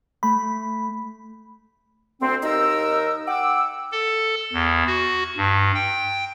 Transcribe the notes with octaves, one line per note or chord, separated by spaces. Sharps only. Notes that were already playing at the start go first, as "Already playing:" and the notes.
A3 B5
D2 C4
D#2 D#4 A#4 E6
F#5 G5 D6 E6
A4
E2
F#4
G2
G5